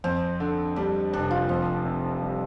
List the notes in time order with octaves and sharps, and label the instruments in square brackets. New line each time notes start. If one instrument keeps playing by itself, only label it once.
[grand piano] F2 [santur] C4
[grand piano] D3
[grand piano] G3 [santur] D4
[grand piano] F1 [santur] D4
[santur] F4
[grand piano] F2 [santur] C4
[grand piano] C3
G3